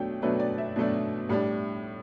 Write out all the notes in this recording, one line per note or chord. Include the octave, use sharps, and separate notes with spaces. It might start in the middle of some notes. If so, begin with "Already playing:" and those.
Already playing: B2 F#3 A3 D4 G5
B2 F#3 A3 D4 B4
D5
E5
B2 F#3 A3 D4
A2 G3 D4